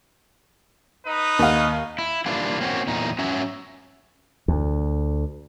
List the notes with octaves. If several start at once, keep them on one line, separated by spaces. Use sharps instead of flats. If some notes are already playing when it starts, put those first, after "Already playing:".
D#4 B4 D#5
D#2 F5
E4
E3 G3 A#3 D4 F4
A#3 C4 C#4 F#4
E2 A#2 D#4
F#3 C#4 E5
D2